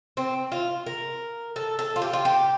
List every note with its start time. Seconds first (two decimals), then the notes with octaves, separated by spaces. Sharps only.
0.17 C4
0.52 F4
0.86 A#4
1.56 A4
1.79 A4
1.96 F4
2.02 G4
2.13 F4
2.25 G4